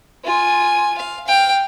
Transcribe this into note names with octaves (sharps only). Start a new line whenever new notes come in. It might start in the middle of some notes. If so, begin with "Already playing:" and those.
F4 G#5
F5
F5 G5